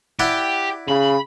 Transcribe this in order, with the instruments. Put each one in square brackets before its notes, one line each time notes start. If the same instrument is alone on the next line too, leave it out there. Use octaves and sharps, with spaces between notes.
[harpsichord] E4 D5 F#5 [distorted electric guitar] G4
[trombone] C#3 [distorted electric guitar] B5